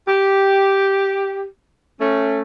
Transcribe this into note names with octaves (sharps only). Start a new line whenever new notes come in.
G4
A3 C#4